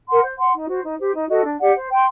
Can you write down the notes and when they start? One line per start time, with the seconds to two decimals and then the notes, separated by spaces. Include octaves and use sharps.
0.08 A#4 F#5 C6
0.22 C5
0.38 F#5 C6
0.53 D#4
0.68 F#4 C5
0.83 D#4
0.98 G4 C5
1.14 D#4
1.29 F#4 A4 D#5
1.44 D4
1.60 G4 D5 F#5
1.75 C5
1.90 G5 C6